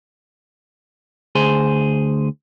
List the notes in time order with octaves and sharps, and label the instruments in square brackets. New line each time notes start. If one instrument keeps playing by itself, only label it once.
[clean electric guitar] D2 G#4 C5